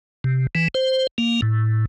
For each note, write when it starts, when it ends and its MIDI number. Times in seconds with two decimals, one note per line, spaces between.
0.24 0.47 48
0.55 0.68 52
0.75 1.07 72
1.18 1.41 58
1.42 1.86 45